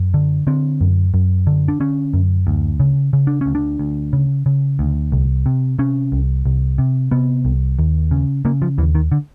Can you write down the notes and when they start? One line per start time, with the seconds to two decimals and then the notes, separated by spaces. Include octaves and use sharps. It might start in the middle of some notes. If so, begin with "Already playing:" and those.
Already playing: F#2
0.14 D3
0.47 D3 C4
0.81 F#2
1.14 F#2
1.47 D3
1.68 D4
1.80 D3 C#4
2.13 F#2
2.47 D2
2.80 C#3
3.13 C#3
3.27 D4
3.41 D2 C#4
3.55 D4
3.79 D2
4.13 C#3
4.46 C#3
4.79 D2
5.12 C2
5.46 C3
5.79 C3 C#4
6.12 C2
6.46 C2
6.78 C3
7.11 C3 B3
7.45 C2
7.79 D#2
8.11 C#3
8.45 C#3 A#3
8.62 F3
8.78 D#2 E3
8.95 D#3
9.12 D3